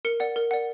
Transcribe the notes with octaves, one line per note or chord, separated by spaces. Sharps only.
A#4 C#7
D5 F#5
A#4
D5 F#5